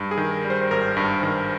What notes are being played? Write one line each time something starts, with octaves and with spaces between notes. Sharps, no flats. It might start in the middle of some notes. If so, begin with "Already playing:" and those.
Already playing: G2
G#4
D#3
A#4
G3
C5
C5
G#1 A#4
G2
D#3